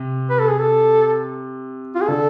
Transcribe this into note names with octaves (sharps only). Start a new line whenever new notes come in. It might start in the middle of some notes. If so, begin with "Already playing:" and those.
Already playing: C3
B4
A4
G#4
A4
F4
G#4
D3 A4